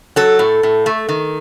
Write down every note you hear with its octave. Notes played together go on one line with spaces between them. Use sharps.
F#3 A4
A2
A2
A3
D#3